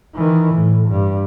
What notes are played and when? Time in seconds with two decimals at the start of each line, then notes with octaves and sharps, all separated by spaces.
0.15 D#3 E3
0.54 A2
0.90 G2